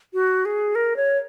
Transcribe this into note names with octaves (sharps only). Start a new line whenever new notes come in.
F#4
G#4
A#4
C#5